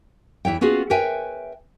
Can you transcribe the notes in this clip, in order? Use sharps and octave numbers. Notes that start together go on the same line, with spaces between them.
E2 E4 C#5 G5
B3 C#4 F4 F#4 G#4
A#4 B4 C#5 E5 G5 G#5